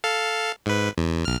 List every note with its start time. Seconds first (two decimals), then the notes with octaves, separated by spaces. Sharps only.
0.04 A4 F5
0.66 G#2 B4
0.98 E2
1.25 B1 F6